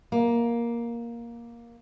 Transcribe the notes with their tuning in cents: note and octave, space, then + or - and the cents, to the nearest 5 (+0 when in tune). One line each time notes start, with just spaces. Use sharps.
A#3 +10